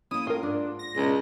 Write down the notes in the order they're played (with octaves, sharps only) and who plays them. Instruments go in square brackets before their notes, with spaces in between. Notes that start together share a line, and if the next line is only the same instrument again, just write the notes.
[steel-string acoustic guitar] A#3 C#4 [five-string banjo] E4 [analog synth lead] D#6
[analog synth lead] A2 [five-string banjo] F4 A#4
[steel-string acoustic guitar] G#2 [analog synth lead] D4
[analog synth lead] A#6
[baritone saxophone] C#2 [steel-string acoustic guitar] B2 D4